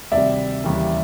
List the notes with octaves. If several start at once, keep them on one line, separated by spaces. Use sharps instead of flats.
D2 C3 D#3 G3 D5 E5
D#2 C#3 E3 G3